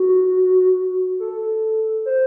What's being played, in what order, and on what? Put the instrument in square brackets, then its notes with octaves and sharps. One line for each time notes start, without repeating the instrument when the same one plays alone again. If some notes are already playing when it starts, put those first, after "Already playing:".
Already playing: [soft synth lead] F#4
A4
C5